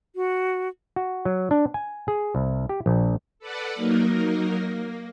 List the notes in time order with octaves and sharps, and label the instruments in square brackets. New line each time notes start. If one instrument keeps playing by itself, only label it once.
[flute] F#4
[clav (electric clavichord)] F#4
F#3
D4
G#5
G#4
C2
G4
A#1
[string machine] A4 B4 D5 F#5
F#3 A#3 D#4 A#4
A#3